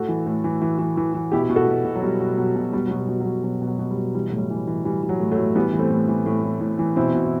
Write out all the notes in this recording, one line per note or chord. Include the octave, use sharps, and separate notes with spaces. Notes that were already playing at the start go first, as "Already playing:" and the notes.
Already playing: A2 F#4 A4
E3
A2
E3
E3
E3
E3
E3
B2 E4 G4
B2
F#4 A4
B2
B2
F#3
B2 G3
B2
B2 F#3
B2
B2 G3
B2 F#3
G3
B2
F#3
B2
B2 F#3
B2
F#3
B2
G3
B2
E3 G3
A2 F#3
G3
E3
E3
E3 G3
E3
F#3
A2
F#3 A3
A2
E3 G3 B3
E3
A3 C4
A2
E3
A2
A2
A2
E3
B2 C4 E4
B2
E4